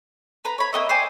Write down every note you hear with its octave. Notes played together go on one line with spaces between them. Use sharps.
B4 A#5 B5
C#5 B5
A#3 B3 D#5 E5
C5 D5 G5 G#5